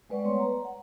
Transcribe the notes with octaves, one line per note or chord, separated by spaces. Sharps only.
G3 G#3 B4 D5 F#5 C#6
A3 B3 B4 C#5 C6
A#5
F#5